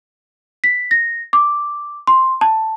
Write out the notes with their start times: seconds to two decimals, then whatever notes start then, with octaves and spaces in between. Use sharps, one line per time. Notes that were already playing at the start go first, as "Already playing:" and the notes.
0.64 B6
0.91 A#6
1.33 D6
2.07 C6
2.41 A5